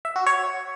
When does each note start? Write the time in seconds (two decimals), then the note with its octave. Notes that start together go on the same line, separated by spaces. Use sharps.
0.05 E5
0.16 F#4
0.26 C#5